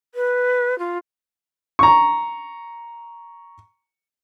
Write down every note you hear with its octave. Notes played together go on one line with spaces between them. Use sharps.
B4
F4
A#5 C#6